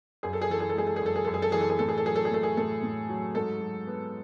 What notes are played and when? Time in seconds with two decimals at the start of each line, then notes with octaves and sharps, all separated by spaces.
0.23 F#2 G#4
0.33 A4
0.42 G#4
0.50 E3 A4
0.60 G#4
0.69 A4
0.75 G#3 G#4
0.87 A4
0.96 G#4
1.02 F#2 A4
1.16 G#4
1.25 F#2 A4
1.34 G#4
1.42 A4
1.52 E3 G#4
1.61 A4
1.70 G#4
1.79 A2 A4
1.89 G#4
1.98 A4
2.05 F#3 G#4
2.16 A4
2.25 G#4
2.31 A3 A4
2.43 G#4
2.57 A2 A4
2.83 A2
3.09 F#3
3.35 G#2 A4
3.61 F#3
3.87 B3